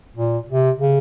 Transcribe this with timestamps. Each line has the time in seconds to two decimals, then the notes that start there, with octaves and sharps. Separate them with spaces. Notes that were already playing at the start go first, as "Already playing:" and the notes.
0.16 A#2
0.49 C3
0.79 C#3